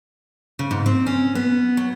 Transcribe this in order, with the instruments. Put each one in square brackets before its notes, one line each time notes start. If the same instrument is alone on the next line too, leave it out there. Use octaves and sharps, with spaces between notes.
[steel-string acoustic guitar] C#3
G#2
C4
C#4
B3
F#3